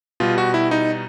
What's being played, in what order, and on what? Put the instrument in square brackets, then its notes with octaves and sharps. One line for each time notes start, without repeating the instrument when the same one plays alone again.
[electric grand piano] B2 G3 F4
F#4
E4
D#4